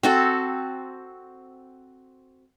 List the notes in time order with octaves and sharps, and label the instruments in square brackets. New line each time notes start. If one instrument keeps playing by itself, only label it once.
[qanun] C4 F#4 A4